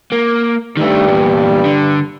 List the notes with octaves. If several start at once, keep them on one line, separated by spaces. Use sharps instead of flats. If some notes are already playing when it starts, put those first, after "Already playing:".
A#3
G2 D#3 G3 A3
E2 A#2
D3